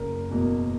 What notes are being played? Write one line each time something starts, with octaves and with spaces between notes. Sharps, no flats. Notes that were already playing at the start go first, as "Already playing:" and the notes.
Already playing: F#1 A#4
E2 B2 A#3